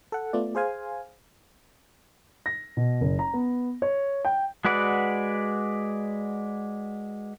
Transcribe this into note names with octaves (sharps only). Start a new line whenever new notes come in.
A4 F#5
A3 B3 F4 D5
G#4 C5 F5 G#5
A#6
B2
F#1
A#5
B3
C#5
G5
G#3 F#4 B4 D5 F#5